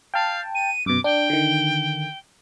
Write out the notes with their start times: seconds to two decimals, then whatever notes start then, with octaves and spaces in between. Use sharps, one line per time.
0.14 F5 G5 A5
0.55 D#7
0.86 F#2 B2 D6
1.04 D4 G5
1.30 D3 D#3